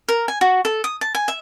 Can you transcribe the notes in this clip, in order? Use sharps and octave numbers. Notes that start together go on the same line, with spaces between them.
A#4
G#5
F#4
A4
D#6
A5
G#5
E5